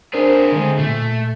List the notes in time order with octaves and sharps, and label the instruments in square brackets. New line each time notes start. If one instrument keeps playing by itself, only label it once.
[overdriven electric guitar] C4 G#4 [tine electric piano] D4 A#4 C5
[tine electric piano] D3 G#3
[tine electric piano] A#2 [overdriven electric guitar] A3